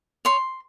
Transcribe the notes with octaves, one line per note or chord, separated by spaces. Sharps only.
C#5 C6